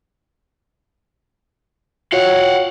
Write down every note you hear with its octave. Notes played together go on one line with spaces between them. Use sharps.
F4 F#4 C#5 F5 F#5